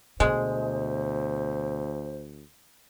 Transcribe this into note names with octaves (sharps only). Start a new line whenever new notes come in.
D2 B2 G#3 C5